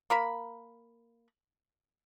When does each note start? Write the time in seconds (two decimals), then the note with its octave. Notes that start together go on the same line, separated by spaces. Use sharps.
0.10 A#3 A#4 B5